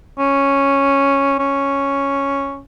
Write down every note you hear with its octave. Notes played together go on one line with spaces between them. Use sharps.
C#4
C#4